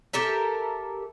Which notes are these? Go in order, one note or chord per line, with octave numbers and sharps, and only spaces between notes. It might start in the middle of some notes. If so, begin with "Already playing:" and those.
G4 A4 A#4 E5